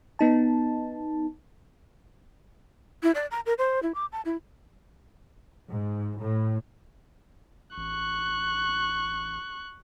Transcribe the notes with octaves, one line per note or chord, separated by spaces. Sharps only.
B3 D#4 A5
E4
D5
A#5
A#4
C5
E4
D6
A5
E4
G#2
A2
A1 C#6 F#6